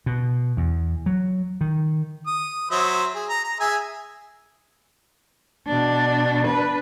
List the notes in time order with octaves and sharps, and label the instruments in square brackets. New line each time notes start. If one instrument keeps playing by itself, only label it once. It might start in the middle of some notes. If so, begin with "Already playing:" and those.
[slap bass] B2
E2
F#3
D#3
[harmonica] D#6
F#3 C5 E5
G#4
A#5
A#5
G#4 E5 G#5
[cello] B2 D4
D4 B4